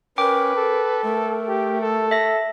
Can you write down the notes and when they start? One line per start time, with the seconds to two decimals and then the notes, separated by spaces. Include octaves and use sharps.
0.18 C#4 A#4 B4 G5 D6
0.56 A4
1.04 A3 A#4
1.48 G4
1.81 A4
2.11 E5 A#6